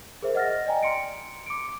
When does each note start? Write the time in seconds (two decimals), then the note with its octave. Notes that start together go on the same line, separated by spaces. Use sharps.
0.23 G#4 A#4 C5 E5
0.35 D#5 F#5 F6 A6 A#6
0.66 D5 D#5 G5 G#5 A#5
0.83 A#5 C6 C#7 D7
1.46 D6 C#7 D7